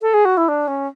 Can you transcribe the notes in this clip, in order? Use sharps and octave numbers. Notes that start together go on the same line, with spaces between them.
A4
G#4
F#4
E4
D4
C#4